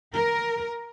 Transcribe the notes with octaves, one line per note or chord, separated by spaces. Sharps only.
A#4